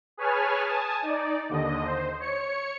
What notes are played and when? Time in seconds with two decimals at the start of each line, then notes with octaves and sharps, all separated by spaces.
0.17 G#4 B4 C#5 G#5 A5 F6
0.67 G#5 A5 D#6
1.02 D#4 D5
1.49 D#2 D3 D#5
1.85 C5
2.20 C#5 C#7